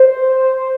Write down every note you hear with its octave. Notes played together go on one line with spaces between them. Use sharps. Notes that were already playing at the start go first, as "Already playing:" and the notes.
Already playing: C5
C5